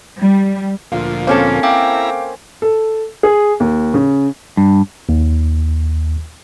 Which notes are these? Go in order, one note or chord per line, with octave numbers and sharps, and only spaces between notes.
G3
D2 A#2 F3 F4 F5
A#3 C4 C#4 A4
E4 F5 G5 A#5 D6
A4
G#4
D#2
C#3
G2
D#2